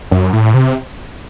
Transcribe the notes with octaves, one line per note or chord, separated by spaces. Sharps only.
F#2
A2
C3